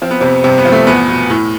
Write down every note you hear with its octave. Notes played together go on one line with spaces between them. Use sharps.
F3 C4
B3
F2 C3 C4
G2 C3 C4
B3
F3
A3
E2 B3
B2
A2